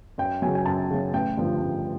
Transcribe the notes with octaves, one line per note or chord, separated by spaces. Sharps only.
F#2 G5
C#3 F#3 G#5
G#5
F#2 A5
C#3 F#3
A1 G5
G2 D3 F3
A1